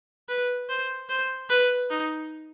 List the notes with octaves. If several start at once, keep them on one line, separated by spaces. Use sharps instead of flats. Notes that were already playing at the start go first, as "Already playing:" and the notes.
B4
C5
C5
B4
D#4